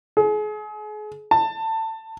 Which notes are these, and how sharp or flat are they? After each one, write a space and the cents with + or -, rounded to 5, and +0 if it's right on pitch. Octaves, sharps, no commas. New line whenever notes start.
G#4 +35
A5 +20